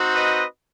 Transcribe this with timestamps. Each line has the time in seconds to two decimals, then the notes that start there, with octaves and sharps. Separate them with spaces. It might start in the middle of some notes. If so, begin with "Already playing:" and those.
Already playing: C4 D#4 F#4
0.14 B4 D#5